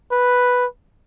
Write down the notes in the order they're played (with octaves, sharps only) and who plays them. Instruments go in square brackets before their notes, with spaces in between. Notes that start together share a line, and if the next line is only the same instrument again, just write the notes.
[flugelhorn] B4